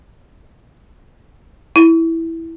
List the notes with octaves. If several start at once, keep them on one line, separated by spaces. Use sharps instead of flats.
E4